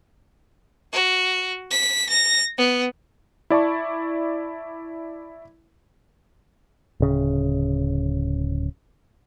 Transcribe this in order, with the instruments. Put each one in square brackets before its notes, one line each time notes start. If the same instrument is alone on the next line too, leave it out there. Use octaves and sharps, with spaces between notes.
[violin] F#4
B6
A#6
B3
[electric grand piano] E4 D5 A5 C#6
[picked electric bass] D1 C#3